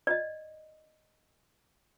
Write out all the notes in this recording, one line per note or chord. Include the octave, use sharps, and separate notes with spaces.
D5 D#5